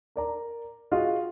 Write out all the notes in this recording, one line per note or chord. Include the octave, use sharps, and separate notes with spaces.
A#4 D5 A#5
F4 F#4 G#4 D#5